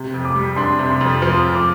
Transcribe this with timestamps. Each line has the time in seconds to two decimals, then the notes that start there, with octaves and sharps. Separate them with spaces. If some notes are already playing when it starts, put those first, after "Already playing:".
Already playing: C3
0.14 F2
0.25 D6
0.35 G3
0.56 D4 C6
0.79 C3
0.90 C6
1.01 F2
1.22 F3 C6
1.43 F2
1.55 D6